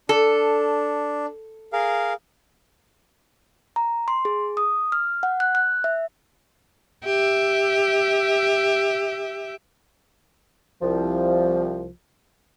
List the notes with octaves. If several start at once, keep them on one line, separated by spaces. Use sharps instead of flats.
D4 A4
G#4 A#4 F5
A#5
C6
G#4
D#6
F6
F#5
F#6
F#6
E5
G4 E5
C2 F3